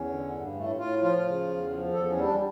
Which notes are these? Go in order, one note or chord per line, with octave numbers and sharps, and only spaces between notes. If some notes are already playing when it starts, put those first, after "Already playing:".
Already playing: E2 C#4
D3
G2
A2 A3
A2 F4
F3 F4
C#3
E2
F3
E2 A4
C#4
G3
D4